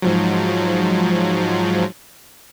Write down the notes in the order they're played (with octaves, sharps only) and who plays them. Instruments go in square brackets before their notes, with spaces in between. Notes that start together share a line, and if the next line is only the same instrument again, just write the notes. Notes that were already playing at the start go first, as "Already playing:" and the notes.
[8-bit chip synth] G#2 F3 F#3